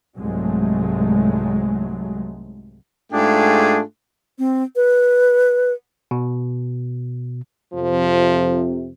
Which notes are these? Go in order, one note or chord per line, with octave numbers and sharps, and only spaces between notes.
C2 G#2 F#3 G#3 A3
G#2 A3 D4 F4 G4 G#4
C4
B4
B2
F2 C3 F3